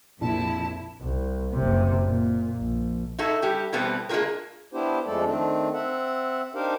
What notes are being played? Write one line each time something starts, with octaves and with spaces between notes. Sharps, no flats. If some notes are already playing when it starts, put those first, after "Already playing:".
A#1 F2 C3 A#3 E4 A5
C2
F#1 C3
A#2
A#1
D#4 E4 F#4 A4
G3 F#4 G4
B2 E3 G3 A3 B3 C4
G#3 A#3 D4 F4 G4 A#4
B3 D4 E4 G4 C5
F2 F3 G#3 A3 A4 D5
D#3 A3 C4 D4
C4 E5 F#5
D4 D#4 G4 A#4 C5 F5